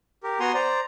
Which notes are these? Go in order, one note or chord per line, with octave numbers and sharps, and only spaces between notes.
G4 A#4
B3 F#4 G#5 A#5 C6
C5 D5 A#5